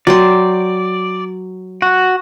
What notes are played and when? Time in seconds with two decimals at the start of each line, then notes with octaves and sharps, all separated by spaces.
0.07 F#3 D5 G5 C6
1.82 F#4